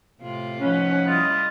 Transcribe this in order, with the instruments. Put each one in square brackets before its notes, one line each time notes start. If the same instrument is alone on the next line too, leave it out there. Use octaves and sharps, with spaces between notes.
[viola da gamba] A2 C3 F4
[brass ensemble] F3 D#4 F#5 [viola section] C#4 [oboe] B4
[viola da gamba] G3 E4 [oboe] F4 [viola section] D#5